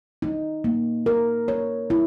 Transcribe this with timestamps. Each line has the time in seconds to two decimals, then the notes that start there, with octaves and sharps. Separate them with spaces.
0.22 D#4
0.64 A#3
1.06 A#4
1.48 C#5
1.90 E4